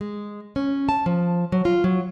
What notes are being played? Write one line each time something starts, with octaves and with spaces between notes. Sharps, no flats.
G#3
C#4
A5
F3
F#3
F4
F#3